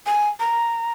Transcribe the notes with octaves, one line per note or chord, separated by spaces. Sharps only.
G#5
A#5